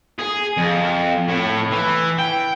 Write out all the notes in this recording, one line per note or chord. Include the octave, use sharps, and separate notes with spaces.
G#4
F2
A2
E3
G5